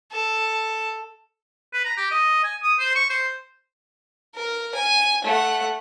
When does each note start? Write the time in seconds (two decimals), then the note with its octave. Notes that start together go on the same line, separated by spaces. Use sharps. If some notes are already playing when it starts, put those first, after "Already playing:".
0.12 A4
1.73 B4
1.85 A#5
1.97 G4
2.11 D#5
2.44 G#5
2.62 D#6
2.79 C5
2.95 C#6
3.10 C5
4.36 A#4
4.75 G#5
5.24 A3 F#5